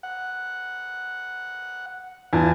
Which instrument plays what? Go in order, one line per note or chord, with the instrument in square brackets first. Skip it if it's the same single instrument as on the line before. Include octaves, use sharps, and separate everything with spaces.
[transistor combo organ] F#5
[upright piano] E2 [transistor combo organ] F4 G#5 A5